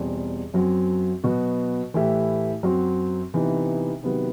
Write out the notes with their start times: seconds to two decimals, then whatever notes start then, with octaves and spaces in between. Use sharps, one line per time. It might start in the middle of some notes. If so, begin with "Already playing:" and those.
Already playing: E2 B2 G3 C4
0.54 F#2 F#3 C4
1.24 B2 F#3 B3 F#4
1.94 A2 E3 A3 E4 G4
2.63 F#2 F#3 C4 F#4
3.34 C3 E3 B3 D#4
4.03 C3 D#3 F#3 B3